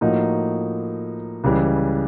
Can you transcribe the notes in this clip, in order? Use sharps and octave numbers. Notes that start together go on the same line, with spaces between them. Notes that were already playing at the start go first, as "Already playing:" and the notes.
A2 F3 A#3 D#4 F#4
C#2 C#3 E3 G3